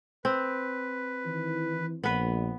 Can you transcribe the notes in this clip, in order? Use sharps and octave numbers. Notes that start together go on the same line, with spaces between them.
C4 B4
D#3 E3
A#1 B3 B4